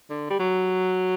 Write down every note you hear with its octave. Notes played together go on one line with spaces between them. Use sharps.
D3
G3
F#3